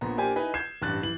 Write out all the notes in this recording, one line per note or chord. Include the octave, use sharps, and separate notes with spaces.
A#1 A#2 B3 A#5
A#3 D4 G4 C5 G#5
D#4 E4 B4 D#5 G#5
G6 G#6 C7 E7
A1 G2 F#6 A6 F#7
E3 F#7